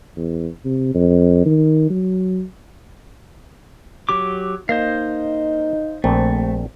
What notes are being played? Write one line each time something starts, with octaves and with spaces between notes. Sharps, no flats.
E2
C3
F2
D#3
F#3
F#3 G4 D6
A#3 D#4 C5 D#5 F5
A#1 A3 C4